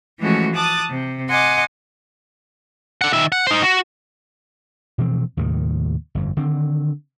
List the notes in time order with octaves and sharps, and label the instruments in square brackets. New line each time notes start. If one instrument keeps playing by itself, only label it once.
[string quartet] E3 F3 G#3 A3 C#4 F#4
A5 D6 D#6 F#6 A6
C3
D#5 F#5 G#5 C6 D6
[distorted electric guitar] D3 F#5
D#3 E5
F#5
D#4 C5
F#4
[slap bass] B2 E3 F3 C4
D#2 A2 C3 D#3
G1 F2
D3 D#3 C4